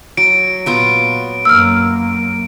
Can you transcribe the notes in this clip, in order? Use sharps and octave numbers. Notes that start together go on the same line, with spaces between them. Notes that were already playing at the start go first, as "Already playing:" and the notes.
F#3 D7
A#2 F#3 B3 F4
F#2 A#3 E6 F6